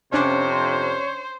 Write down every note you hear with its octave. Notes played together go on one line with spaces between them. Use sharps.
F2 C3 C#4 D4 C5 C#5